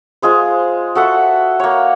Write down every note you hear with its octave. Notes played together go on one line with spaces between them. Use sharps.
G#3 F4 G#4 C5
F#4 A4 E5 F#5
A#3 C#5